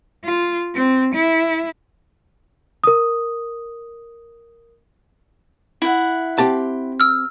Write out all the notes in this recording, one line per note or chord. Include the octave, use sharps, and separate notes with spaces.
F4
C4
E4
A#4 D#6
E4 F#5
C4 G4 A5
E6 F6